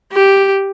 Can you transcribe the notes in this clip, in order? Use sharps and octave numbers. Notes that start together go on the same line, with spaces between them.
G4